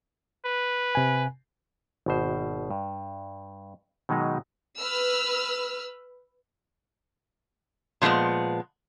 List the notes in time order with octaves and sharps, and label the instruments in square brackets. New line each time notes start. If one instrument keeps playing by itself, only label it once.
[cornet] B4
[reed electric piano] C3 G#5
[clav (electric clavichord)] G#1 B2 C5
G2
B2 D#3 F#3 G#3 D#4
[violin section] B4 E6 F6
[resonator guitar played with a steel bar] A#2 F3 F#3 G#3 B3